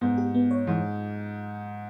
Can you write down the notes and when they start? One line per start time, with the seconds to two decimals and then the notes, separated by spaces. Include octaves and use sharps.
0.01 G#2 B3
0.18 G4
0.35 B3
0.51 C#5
0.67 G#2 E3